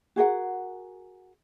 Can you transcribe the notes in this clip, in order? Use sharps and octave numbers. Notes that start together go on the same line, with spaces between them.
F#4 G#4 A#4 F#5